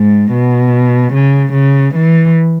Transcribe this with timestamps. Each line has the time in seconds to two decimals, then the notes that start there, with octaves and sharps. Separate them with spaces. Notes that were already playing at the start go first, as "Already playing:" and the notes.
Already playing: G#2
0.32 B2
1.12 C#3
1.53 C#3
1.94 E3